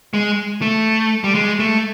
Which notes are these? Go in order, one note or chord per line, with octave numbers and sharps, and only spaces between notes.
G#3
A3
G3
G#3
A3